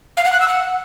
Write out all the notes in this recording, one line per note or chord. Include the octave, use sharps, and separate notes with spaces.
F5
F#5
F#6
E6
F#5